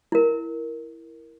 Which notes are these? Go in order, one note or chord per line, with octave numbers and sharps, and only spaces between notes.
E4 A#4